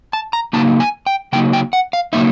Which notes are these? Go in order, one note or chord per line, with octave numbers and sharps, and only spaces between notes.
A5
A#5
C#3 F#3 A#3 D#4 A5
G#5
G5
C#3 F#3 A#3 D#4 G5
G5
F#5
F5
C#3 F#3 A#3 D#4 E5